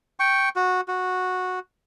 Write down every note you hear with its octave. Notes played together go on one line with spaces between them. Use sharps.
G5 C#6
F#4
F#4